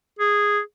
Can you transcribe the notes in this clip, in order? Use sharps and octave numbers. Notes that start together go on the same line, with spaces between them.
G#4